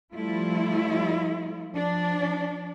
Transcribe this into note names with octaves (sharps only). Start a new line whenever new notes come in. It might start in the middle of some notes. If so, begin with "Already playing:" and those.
F3 G3 A3 E4 F4
F3 D4